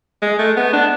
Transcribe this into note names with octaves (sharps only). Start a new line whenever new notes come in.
G#3
A3
B3
D4